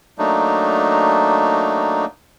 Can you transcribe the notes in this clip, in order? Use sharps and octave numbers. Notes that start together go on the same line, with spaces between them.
F#3 A3 A#3 D4 D#4